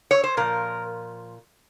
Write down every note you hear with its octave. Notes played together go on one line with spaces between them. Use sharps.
C#5
C5
A#2 F3 A#4